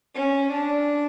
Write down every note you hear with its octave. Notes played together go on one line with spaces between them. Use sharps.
C#4
D4